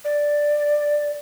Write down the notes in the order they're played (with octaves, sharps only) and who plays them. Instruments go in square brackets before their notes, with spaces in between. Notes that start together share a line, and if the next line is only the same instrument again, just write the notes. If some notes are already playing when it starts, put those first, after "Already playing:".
[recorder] D5